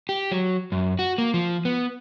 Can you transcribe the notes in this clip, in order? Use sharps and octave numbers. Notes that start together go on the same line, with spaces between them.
G4
F#3
F#2
F#4
A#3
F3
B3